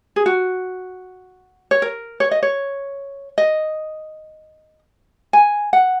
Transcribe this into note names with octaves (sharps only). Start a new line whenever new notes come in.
G#4
F#4
C#5
A#4
C#5
D#5
C#5
D#5
G#5
F#5